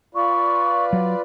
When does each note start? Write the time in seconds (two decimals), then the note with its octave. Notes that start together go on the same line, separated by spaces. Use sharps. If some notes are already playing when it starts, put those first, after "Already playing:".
0.15 F4 B4 D5 C#6
0.93 F#3